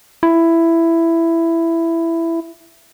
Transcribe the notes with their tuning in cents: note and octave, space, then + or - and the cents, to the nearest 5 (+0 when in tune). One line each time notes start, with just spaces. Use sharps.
E4 +10